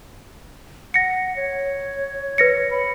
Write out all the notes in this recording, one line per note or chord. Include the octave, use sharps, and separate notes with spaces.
F#5 A#6 C#7
C#5
B4 A#6 C#7
B5